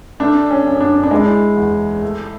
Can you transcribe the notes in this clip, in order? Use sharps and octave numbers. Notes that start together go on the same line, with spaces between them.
A3 D4
C#4
F#2
D4
D4
G#3 E4
E2
A3